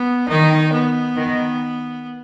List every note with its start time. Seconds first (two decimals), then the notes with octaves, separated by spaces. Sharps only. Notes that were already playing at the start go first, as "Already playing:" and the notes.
Already playing: B3
0.29 D#3 D#4
0.73 B3
1.17 D#3